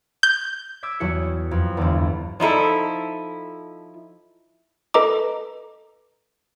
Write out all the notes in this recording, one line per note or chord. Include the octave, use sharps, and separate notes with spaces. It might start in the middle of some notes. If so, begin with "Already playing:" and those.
G6
D6 E6 G#6 B6
E2 F#3 G3 E4 G#4 C#7
F2
G1 E2
F3 D#4 E4 A4
A4 B4 D#5 A#5 D6